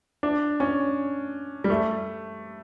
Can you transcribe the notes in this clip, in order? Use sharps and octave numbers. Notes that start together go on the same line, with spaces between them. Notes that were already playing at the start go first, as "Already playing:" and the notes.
D4
C#4
G3
A3